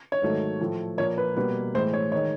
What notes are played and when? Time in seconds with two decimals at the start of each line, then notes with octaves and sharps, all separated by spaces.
0.12 C#5
0.22 G#2 D#3 F#3 A3
0.60 A2 F3 A3
0.98 A#2 F3 A#3 C#5
1.18 B4
1.36 B2 G3 A#3 B4
1.75 A2 E3 G#3 C5
1.94 C#5
2.12 D#3 G#3 C#5